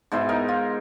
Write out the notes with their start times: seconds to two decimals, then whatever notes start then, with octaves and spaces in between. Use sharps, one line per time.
0.12 G#2 B2 E4 C5
0.29 D#4 A#4
0.48 F4